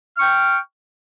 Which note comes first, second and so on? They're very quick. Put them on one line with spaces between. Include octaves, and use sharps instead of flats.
F6 C#6 G5